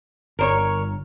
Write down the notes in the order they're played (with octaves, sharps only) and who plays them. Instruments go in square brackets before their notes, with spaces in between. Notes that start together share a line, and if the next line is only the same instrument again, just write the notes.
[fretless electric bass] G1 [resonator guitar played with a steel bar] A#4 C5 C#5